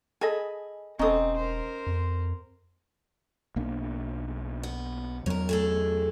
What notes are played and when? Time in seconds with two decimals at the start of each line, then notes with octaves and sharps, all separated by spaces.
0.21 G#4 A4 D#5 G#5 B5
0.99 E1 C4 C#4 D#4 A4 D#6
1.37 A#4 C5
1.87 F2
3.56 B1 A#3 D4
4.63 B3
5.26 E2 F#3 A#4 C#5
5.49 A3 G#4 A4